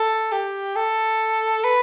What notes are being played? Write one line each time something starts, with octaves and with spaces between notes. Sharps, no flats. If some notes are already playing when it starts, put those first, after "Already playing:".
Already playing: A4
G4
A4
B4